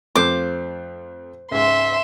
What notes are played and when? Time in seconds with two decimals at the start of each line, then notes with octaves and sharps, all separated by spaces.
0.15 F2 A3 F4 C5 D6
1.51 C#2 G#2 E5 C6